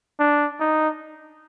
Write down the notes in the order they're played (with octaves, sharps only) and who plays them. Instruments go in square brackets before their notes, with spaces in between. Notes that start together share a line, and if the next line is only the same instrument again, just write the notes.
[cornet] D4
D#4